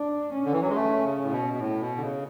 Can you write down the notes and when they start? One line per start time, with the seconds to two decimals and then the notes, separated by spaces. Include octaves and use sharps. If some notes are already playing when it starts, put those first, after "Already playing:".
Already playing: D4
0.34 C#4
0.45 D3
0.53 E3
0.61 F#3
0.69 G#3
0.76 A3
1.04 C#3
1.23 A2
1.32 B2
1.53 B2
1.60 A2
1.80 B2
1.97 D3
2.02 C#3